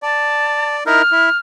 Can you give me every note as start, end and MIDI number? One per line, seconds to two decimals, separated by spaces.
0.02 0.84 74
0.02 0.76 81
0.86 1.02 63
0.86 1.02 64
0.86 1.02 70
0.86 1.38 89
1.12 1.29 64